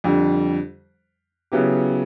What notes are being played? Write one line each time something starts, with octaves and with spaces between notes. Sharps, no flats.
F2 D3 G3
C#3 F#3 B3 E4 G4